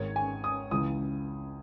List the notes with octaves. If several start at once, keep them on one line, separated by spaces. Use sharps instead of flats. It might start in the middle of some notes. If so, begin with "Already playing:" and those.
Already playing: G#1 G#2 D#3 C#5
G#5
D#6
C#2 C#3 E3 D#6